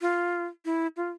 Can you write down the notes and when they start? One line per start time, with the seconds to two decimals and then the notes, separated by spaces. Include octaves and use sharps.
0.02 F4
0.65 E4
0.97 F4